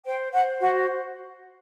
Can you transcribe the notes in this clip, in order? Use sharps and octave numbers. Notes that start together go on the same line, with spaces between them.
C5 G5
C5 F#5
F#4 F#5